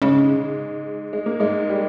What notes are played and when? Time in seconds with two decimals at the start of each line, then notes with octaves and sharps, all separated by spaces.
0.02 G#2 C#3 G#3
1.13 G#3
1.26 A#3
1.40 G#2 G#3
1.69 G3